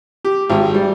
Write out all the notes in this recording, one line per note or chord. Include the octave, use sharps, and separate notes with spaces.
G4
G#1
G3